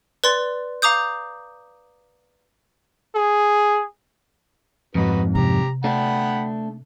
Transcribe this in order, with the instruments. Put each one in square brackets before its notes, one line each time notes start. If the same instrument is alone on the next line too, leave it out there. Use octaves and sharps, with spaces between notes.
[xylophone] B4 D5 C6 A6
F5 A#5 D6 D#6 G6
[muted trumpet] G#4
[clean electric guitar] F2 G#2 [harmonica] D#4 F#4 B4
[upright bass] C3 [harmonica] G4 A#5
[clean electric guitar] A3 D4 [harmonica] F#5 G5 B5